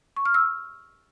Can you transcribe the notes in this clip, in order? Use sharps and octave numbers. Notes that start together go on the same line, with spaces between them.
C#6
F6
E6